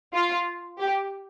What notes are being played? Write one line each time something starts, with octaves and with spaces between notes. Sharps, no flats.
F4
G4